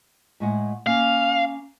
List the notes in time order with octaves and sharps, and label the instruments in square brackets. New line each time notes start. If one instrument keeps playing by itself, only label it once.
[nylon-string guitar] A2 G#3 F#5
[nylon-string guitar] A#3 C#4 [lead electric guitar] F5